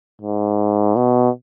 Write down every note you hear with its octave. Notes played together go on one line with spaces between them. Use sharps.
G#2
B2